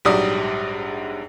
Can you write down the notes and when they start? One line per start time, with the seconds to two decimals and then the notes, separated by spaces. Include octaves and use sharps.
0.05 A#1 G#2 F#3 G3 D5 D#6